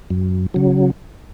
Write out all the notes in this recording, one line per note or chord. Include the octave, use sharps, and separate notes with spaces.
F#2
C#3 F#3